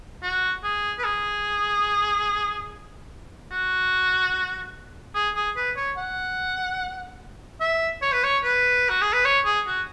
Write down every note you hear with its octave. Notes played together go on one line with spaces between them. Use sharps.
F#4
G#4
B4
G#4
F#4
G#4
G#4
B4
C#5
F#5
E5
C#5
B4
C#5
B4
F#4
G#4
B4
C#5
G#4
F#4